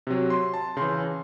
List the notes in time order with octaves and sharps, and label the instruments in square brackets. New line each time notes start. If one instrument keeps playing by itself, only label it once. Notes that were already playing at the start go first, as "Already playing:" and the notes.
[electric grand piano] C3 F#3
C6
A5
C#3 E3 C6